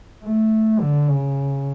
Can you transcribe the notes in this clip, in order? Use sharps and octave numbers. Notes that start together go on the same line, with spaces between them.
A3
D3
C#3